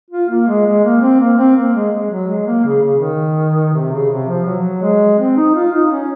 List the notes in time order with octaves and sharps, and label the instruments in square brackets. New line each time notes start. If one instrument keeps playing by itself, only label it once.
[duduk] F4
A#3
G#3
G#3
A#3
C4
A#3
C4
A#3
G#3
G#3
F#3
G#3
A#3
C#3
C#3
D#3
C3
C#3
C3
F3
F#3
G#3
C4
D#4
F4
D#4
C#4